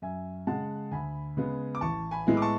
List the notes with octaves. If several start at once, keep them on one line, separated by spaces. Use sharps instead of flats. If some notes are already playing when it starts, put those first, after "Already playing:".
F#2 E5 G#5
C#3 G#3 F#5 A5
D2 G#5 B5
C#3 G#3 B3
D6
A1 A5 C#6
G#5 B5
A2 G#3 B3 E4
D6
A5 C#6